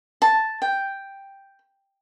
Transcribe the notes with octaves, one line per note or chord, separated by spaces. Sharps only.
A5
G5